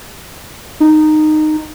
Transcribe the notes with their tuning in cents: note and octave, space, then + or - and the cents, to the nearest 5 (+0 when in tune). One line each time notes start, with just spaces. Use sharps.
D#4 -15